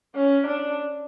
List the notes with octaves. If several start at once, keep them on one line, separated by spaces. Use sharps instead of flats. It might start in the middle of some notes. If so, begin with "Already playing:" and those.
C#4
D4